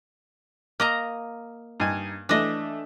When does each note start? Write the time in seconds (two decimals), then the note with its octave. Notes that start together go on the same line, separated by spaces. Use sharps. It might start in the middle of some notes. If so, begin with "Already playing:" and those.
0.80 A#3 D#5 A#5
1.80 G2 D#4 G#5
2.29 E3 A3 D4 D#5